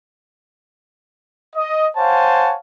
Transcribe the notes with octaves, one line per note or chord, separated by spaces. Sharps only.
D#5
C5 C#5 F5 F#5 G#5 A5